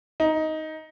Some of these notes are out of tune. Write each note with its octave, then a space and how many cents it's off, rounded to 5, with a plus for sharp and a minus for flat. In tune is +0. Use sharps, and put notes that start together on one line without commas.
D#4 +10